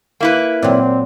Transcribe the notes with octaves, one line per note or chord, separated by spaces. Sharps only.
A#3 E4 B4
A#2 F#3 C4